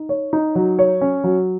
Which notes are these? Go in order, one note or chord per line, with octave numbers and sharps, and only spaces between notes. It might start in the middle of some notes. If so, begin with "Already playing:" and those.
Already playing: D#4
C#5
D#4
F#3
C#5
C#4
F#3